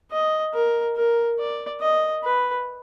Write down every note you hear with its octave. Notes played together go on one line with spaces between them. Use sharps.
D#5
A#4
A#4
D5
D#5
B4